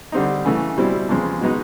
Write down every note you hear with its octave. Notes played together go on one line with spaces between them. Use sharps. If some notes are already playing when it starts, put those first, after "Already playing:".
D3 G3 C4 D#4
C#3 E3 A3
B2 G3 C4 E4
E2 C#3 F3 G#3 C4
B2 G#3 B3 D#4 F#4